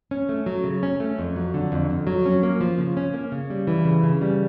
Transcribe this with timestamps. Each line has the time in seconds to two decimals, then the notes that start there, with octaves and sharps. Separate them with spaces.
0.11 C#4
0.29 A3
0.46 F#3
0.64 C#3
0.83 C#4
1.00 A3
1.18 F2
1.36 F#3
1.54 D3
1.72 F2
1.90 F2
2.07 F#3
2.26 C#4
2.43 A#3
2.61 F3
2.78 C#3
2.97 C#4
3.14 A#3
3.32 C#3
3.50 G3
3.67 E3
3.85 C#3
4.03 C#3
4.21 G3